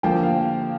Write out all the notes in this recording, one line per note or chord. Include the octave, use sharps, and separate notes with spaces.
D3 F3 A#3 G5
F5